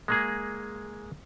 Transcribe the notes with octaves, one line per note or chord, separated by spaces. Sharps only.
G#3 A#3 G#4